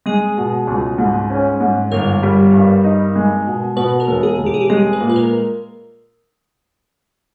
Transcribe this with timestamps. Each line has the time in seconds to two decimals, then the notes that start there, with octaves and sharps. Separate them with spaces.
0.06 G#3 G#4
0.37 B2
0.67 C#2
0.98 G#2
1.30 C#4
1.61 G#2
1.92 G1 A#4
2.23 G3
2.53 G2
2.84 D#4
3.16 G#3
3.46 B2
3.76 B2 B4
4.00 A#4
4.07 E1
4.23 G#4
4.39 E1
4.46 G4
4.54 G#4
4.61 G4
4.70 G#3 G#4
4.93 B4
5.01 A#2
5.09 B4
5.16 A#4